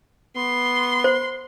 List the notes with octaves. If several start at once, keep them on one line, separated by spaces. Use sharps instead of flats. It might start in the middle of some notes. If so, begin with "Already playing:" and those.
B3 C6
C5